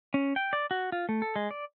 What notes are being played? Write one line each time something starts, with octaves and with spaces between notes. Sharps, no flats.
C#4
G5
D5
F#4
F4
A3
A4
G#3
D5